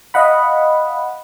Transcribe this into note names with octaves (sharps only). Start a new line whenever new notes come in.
D#5 F5 F#5 B5